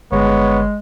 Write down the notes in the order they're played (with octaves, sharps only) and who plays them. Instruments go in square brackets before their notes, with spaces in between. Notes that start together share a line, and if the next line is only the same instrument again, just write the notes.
[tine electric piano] G1 [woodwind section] G#3 [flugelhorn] B3 [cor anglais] C#5